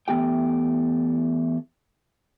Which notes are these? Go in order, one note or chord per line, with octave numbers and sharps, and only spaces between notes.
E3 A3 B3 G4 G5